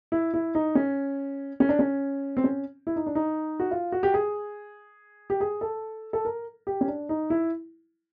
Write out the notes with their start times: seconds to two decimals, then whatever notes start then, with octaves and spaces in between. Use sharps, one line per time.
0.12 E4
0.34 E4
0.55 D#4
0.75 C#4
1.60 C#4
1.69 D4
1.79 C#4
2.37 C4
2.44 C#4
2.87 E4
2.96 D#4
3.06 D4
3.15 D#4
3.60 F#4
3.71 F4
3.92 F#4
4.03 G4
4.14 G#4
5.30 G4
5.41 G#4
5.61 A4
6.13 A4
6.25 A#4
6.67 G4
6.81 C#4
6.88 D4
7.09 D#4
7.30 E4